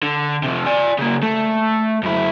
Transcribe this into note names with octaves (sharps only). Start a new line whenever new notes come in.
D3
C3 F3
D5 G#5
C#3 A#3
A3
F#2 E4